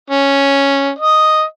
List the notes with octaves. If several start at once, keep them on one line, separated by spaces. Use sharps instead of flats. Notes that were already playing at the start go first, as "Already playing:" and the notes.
C#4
D#5